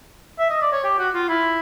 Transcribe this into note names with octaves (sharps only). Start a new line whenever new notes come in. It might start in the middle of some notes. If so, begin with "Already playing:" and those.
E5
D#5
D5
C#5
G4
F#4
F4
E4